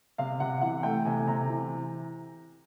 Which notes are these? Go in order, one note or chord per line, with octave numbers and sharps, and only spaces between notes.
C3 F5
C3 F#5
E3 F#5
A3 G5
C3 G#5
C3 A#5
E3